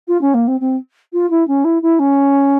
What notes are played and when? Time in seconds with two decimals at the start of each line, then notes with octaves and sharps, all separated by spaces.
0.08 F4
0.21 C#4
0.34 A#3
0.48 C4
0.61 C4
1.13 F4
1.31 E4
1.48 C#4
1.65 E4
1.82 E4
1.99 C#4